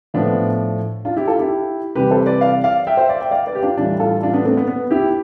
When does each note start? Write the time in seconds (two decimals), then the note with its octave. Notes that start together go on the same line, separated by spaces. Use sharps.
0.14 A2 F3 B3 D4
1.05 D4 F4
1.17 E4 G4
1.27 F4 A4
1.39 E4 G4
1.95 C3 E3 G3 G4 B4
2.11 A4 C5
2.26 B4 D5
2.41 D5 F5
2.64 D5 F5
2.87 E5 G5
2.97 C5 E5
3.09 D5 F5
3.20 E5 G5
3.31 D5 F5
3.46 B4 D5
3.55 G4
3.62 D4 F4
3.77 A2 E3 G3 D4 F4
3.99 F4 A4
4.23 D4 F4
4.33 B3 D4
4.45 A3 C4
4.57 B3
4.68 B3
4.90 E4 G4